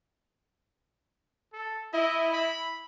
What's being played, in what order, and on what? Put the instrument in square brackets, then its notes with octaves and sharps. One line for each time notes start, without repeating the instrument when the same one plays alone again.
[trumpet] A4
[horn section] E4 [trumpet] D#5
[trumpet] B5